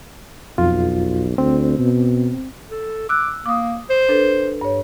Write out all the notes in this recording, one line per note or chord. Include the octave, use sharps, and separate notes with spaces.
B1 F2 F4
D2 C4
B2
A4
D6 E6 F#6
A#3 D6 D#6
C5
D4 A4 B4
G2 C#5